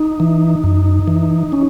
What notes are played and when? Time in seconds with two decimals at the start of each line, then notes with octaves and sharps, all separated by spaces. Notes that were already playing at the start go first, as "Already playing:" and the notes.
Already playing: D#4
0.20 E3
0.64 F#2
1.08 E3
1.52 C#4